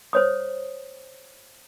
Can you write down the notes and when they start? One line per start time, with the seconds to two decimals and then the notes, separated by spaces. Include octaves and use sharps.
0.13 C5 C#5 D#6